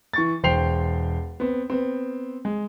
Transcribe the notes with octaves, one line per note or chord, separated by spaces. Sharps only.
E3 C#6 A6
E1 C5 G5 C7 F7
B3 C4
B3 C4
G#3